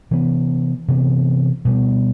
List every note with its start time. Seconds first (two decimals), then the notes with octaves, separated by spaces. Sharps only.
0.11 C3 E3 B3
0.88 C3 E3 B3
1.65 B2 G3 B3